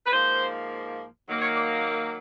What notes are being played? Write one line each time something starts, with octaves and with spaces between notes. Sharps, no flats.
B4
G#2 F3 A#3 C5
D#3 F#3 A#3
C#5
D5